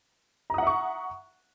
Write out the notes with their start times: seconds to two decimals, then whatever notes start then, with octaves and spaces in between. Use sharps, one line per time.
0.50 A#5
0.54 D#6
0.58 F#5
0.63 E5
0.67 C#6